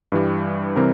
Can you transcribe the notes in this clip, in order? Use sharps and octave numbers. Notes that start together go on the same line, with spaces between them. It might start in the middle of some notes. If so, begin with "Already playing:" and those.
G2 E3 G3
C3 E3 G3 C4 A#4